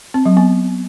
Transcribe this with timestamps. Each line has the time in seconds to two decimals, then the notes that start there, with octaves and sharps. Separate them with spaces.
0.14 C4
0.26 F#3
0.37 B3